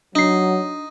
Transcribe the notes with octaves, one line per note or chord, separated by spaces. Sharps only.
F#3 D4 D#4 C7